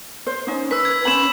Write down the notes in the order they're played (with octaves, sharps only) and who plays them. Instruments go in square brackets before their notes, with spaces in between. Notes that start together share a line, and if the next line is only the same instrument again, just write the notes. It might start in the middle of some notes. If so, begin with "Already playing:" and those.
[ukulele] C5
C#4 D#4
[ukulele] B4 [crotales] E6 B6
[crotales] G#6
[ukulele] C#4 C5 B5 [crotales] E7 F#7